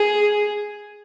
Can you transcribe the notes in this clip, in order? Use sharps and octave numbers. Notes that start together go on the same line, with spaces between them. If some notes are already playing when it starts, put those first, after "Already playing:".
Already playing: G#4